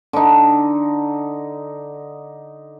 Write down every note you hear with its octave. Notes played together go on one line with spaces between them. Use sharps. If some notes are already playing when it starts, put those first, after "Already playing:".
D3 D#4